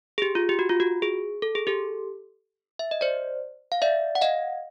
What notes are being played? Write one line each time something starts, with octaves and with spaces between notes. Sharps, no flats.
G#4
G4
F4
G4
F#4
F4
F#4
G#4
A4
G#4
G4 A4
E5
D#5
C5 D5
F5
D5 E5
F#5
D#5 F5